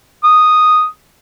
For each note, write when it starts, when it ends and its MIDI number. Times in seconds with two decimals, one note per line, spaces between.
0.24 0.85 87